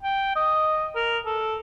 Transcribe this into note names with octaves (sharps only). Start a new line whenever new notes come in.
G5
D#5
A#4
A4